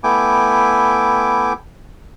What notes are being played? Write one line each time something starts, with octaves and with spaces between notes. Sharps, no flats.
A3 B3 E4 G5 G#5 D6